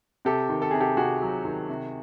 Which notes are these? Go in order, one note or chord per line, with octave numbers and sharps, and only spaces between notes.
C3 G4 A4
D#3
A4
C3 G#4
G4 A4
C3 F#4 G#4
F#3
D#3
C3